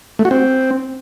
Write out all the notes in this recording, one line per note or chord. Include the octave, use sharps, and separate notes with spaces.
A3
F#4
C4